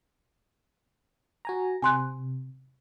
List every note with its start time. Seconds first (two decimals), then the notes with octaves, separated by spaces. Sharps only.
1.45 F#4 G#5 A#5
1.82 C3 G#5 C6 F#6